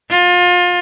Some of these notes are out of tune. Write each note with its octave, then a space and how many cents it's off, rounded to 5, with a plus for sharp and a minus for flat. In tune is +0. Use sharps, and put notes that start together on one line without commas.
F4 +30